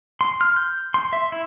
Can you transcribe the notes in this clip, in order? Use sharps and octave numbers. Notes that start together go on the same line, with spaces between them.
C6
F6
G6
C6
E5
E4